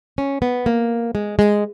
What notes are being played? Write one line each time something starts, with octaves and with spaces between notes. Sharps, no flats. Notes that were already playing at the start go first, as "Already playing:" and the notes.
C#4
B3
A#3
G#3
G#3